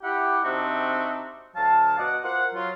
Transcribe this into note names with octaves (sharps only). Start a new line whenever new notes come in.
E4 G4 F#5
C3 C4 D4 D#4 F#4 E5
D2 F#3 F5 A5
B2 D5 D#5 F#5
F4 A#4 C5 F#5
F#3 F4